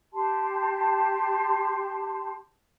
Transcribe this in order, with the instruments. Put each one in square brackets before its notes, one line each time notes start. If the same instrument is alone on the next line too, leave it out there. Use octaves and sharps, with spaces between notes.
[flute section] G4 A5 C6